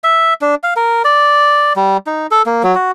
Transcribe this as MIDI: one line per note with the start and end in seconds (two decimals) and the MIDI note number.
0.04 0.34 76
0.41 0.55 62
0.63 0.74 77
0.76 1.02 70
1.04 1.73 74
1.76 1.97 55
2.07 2.27 63
2.31 2.42 69
2.46 2.63 58
2.63 2.75 54
2.75 2.91 66